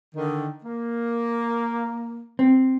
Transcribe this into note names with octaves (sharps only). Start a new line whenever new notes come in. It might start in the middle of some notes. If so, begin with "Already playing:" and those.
D3 D#3
A#3
C4